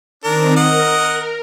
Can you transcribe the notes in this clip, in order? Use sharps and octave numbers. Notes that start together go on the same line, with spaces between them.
D#3 C4 D4 A#4
A#4 D#5 F#5